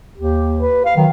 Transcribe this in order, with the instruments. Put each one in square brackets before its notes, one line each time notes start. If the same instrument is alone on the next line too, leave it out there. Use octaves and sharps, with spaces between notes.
[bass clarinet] D#2 [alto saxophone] G4
[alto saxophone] B4
F5
[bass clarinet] D#3 [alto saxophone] F#3